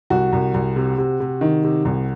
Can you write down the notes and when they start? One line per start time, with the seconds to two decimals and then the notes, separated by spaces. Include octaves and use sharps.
0.10 C2 F#4
0.33 C2
0.54 C2
0.76 C3
0.98 C3
1.20 C3
1.41 D#3
1.64 C3
1.85 C2